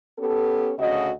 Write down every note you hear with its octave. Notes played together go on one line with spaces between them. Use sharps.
B3 C#4 G4 A4
D2 C#3 F#4 D#5